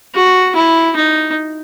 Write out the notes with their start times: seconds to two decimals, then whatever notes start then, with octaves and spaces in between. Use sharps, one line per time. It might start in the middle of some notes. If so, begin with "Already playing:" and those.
0.14 F#4
0.55 E4
0.96 D#4